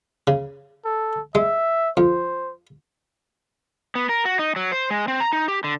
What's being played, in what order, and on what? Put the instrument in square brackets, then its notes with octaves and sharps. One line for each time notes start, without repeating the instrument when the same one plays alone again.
[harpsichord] C#3
[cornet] A4
[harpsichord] G#3 [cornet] E5
[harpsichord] F2 [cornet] C5
[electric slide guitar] B3
A#4
F#4
D#4
F#3
C5
G#3
C4
A#5
D#4
G4
D3